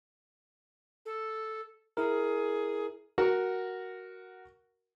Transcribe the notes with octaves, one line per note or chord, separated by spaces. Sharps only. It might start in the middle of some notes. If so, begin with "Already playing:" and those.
A4
E4 G#4 A#4
F#4 A#4 F#5